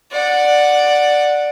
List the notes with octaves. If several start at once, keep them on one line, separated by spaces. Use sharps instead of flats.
D5 F#5